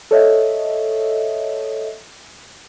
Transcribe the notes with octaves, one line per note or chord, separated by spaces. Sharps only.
A4 C#5 D#5 E5